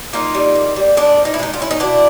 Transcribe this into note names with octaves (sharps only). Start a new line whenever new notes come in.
A#3 D#4 F4
G3
A#3
G3
G#3 D4
F3
D#4
E4
G#3 D#4
F4
C#4 E4
D#4
B2 D4 E4